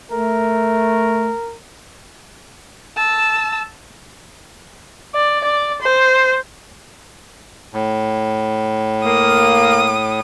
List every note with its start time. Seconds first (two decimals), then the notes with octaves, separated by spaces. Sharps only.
0.12 A3 A#4
2.96 A5 E6
5.15 D5
5.44 D5
5.82 C5
7.73 A2
9.05 A#3 D#6